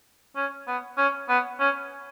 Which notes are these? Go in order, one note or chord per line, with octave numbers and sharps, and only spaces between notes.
C#4
B3
C#4
B3
C#4